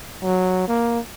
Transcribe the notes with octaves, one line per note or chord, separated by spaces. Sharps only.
F#3
A#3